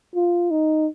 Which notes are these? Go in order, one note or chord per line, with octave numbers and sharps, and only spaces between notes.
F4
D#4